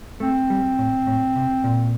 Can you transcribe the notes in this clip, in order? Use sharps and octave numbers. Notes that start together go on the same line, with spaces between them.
A3 C4
G3
A2
A2
C3
A#2